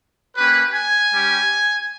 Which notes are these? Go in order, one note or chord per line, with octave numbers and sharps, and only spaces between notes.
A#3 C#4 G4 B4
G#5
G3 C#4 G4